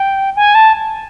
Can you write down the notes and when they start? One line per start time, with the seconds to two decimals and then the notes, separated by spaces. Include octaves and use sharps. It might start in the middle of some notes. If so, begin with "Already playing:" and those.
Already playing: G5
0.36 G#5
0.55 A5